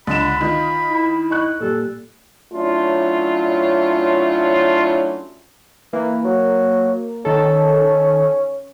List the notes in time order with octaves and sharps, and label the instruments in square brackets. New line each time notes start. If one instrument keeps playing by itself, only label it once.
[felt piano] C#2 E7 [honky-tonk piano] D3 [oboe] B5
[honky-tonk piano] D#3 [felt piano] F4 D#5
[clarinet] E4
[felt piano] D#5 C#6 F#6
[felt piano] A#2 G3 [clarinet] A4
[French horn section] F#3 A3 C#4 D4 E4 F4
[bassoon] E3 [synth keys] A#3
[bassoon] F#3
[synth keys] D#3 A4 [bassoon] C#4